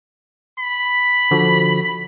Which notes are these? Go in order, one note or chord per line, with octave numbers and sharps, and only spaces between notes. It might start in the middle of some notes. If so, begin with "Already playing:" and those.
B5
D3 F3 F#4